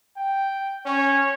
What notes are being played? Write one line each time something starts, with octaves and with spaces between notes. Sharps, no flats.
G5
C#4 C#5